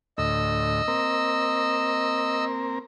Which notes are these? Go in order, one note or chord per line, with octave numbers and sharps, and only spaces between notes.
D2 A2 D#5 E6
A#3 C4 A#4